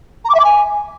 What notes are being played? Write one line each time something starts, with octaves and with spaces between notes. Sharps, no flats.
A#5
D6
E5
D6
G#5